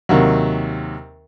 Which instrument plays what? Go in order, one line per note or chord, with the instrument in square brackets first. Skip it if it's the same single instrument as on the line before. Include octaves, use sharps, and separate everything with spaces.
[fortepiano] D#2 C3 F#3